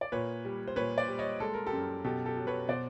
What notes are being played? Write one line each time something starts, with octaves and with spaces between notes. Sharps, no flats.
D5
A#2 B4 C#5
G3
C5
A#2 B4 C#5
C5 D5
G3
C#5 D#5
G#3 A4
A#4
G4 A4
F#2
B2 G4 A4
G4 A4
F#3
B4 C#5
B2 C5 D5